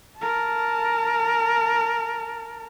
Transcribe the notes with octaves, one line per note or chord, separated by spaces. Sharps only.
A#4 A5